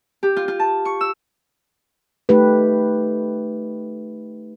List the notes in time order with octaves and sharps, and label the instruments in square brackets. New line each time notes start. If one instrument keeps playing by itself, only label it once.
[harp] G4
F4
F4
A5
C#6
E6
[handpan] A3 D#4 G4 B4